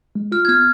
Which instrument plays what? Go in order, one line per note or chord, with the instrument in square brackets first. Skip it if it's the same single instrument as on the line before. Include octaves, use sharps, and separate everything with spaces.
[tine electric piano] G#3
[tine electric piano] F4 [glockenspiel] F6
[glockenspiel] G#6
[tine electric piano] B3 [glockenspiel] F6